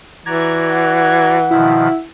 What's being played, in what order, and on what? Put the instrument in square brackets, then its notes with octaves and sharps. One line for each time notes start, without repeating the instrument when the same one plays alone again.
[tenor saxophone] E3 [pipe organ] F#4 D5 A#5 [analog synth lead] G#6
[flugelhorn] F#5
[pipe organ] B2 D#3 F3 [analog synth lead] E4